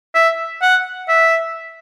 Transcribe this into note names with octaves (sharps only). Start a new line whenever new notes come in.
E5
F#5
E5